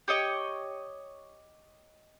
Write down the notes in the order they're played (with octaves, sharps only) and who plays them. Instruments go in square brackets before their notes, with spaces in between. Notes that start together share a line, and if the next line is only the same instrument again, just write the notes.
[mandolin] G4 C#5 D#5 C#6